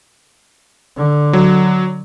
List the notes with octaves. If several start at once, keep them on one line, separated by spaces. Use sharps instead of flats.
D3
F#3